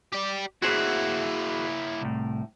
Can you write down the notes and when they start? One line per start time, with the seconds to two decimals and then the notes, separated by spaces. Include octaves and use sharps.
0.12 G4 D5
0.62 A#3 E4 F#4 G#4 C5
2.01 C2 A2